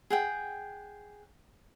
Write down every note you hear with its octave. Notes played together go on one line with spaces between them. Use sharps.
G#4 F#5 G5